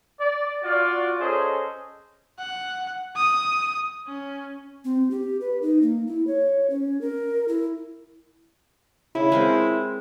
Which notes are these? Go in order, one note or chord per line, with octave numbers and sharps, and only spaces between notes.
D5
F4 F#4 D5
C#4 G#4 A4 C5 C#5 D#5
F#5
D#6
C#4
C4
G4
B4
D#4
A#3
E4
C#5
C#4
A#4
E4
C#3 E4
G#3 C4 A#4